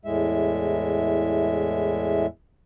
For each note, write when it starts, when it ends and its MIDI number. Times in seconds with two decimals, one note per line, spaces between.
0.05 2.26 40
0.05 2.26 45
0.05 2.26 56
0.05 2.26 76